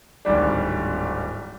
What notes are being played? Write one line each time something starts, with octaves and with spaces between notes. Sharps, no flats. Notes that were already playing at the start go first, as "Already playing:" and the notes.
D1 G#1 G3 D4